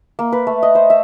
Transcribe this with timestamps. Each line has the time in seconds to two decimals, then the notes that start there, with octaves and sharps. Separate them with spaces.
0.19 A#3
0.32 B4
0.47 A3
0.63 D#5
0.75 C5
0.90 E5